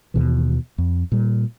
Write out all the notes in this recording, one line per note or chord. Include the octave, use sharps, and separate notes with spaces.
D#2 B2 E3
F2
A#2 G3